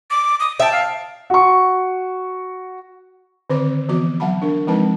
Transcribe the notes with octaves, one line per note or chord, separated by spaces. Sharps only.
D6
D#6
E5 G5 A5
F5
F#4 C#6
D3 D#3 C4 B4 C5 D6
E3 F3 B3 F#4 D6
F#3 F#5 A5 B5
D4 A#4
F3 G#3 C4 D#4 B4 A5